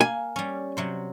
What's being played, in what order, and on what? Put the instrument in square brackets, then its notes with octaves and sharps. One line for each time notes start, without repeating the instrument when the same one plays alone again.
[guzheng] A#3 [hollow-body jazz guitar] G#5
[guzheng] G3 C#4
C3 F#3 C5